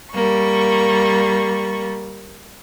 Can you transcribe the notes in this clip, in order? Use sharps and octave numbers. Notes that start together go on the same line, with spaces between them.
G3 A#3 C#6